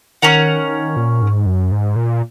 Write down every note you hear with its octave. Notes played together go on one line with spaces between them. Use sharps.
D#3 C#4 A#4 F#5
A#2
G#2
F#2
G#2
A#2